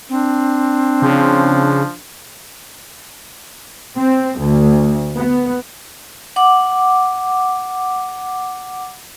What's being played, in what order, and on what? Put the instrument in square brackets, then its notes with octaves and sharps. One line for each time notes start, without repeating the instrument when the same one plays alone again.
[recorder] C4 [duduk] D4
[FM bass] C#3 [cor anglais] F3
[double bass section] C4
D2
B3
[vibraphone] F#5 D6